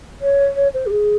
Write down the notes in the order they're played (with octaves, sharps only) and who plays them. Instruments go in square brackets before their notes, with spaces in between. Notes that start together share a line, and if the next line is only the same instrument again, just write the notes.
[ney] C#5
C#5
C5
G4
G#4